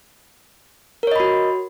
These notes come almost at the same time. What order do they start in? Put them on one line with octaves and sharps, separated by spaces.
A#4 C#5 D#5 B5 F#4